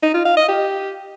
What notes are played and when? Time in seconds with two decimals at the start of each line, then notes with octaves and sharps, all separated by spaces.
0.03 D#4
0.14 F4
0.25 F5
0.37 D#5
0.48 G4